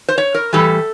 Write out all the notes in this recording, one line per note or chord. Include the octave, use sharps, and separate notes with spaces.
C5
C#5
A#4
A2 E3 G3 A4